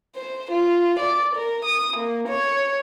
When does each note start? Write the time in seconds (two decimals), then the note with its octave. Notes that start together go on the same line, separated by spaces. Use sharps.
0.16 C5
0.51 F4
0.99 D5
1.36 A#4
1.65 D#6
1.97 A#3
2.28 C#5